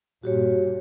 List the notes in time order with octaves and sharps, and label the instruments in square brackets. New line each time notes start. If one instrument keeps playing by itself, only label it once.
[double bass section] G2 A#2 [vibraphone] F#4 G4 C#5